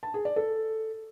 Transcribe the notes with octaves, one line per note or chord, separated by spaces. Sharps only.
A5
G#4
D5
A4